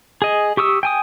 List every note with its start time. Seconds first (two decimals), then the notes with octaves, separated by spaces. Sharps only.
0.22 G#4 D#5
0.57 G4 C#6 D#6 E6
0.83 G5 G#5 D#6